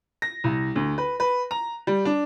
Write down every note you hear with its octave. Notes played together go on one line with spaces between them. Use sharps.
A#6
C2
D2
B4
B4
A#5
G3
D4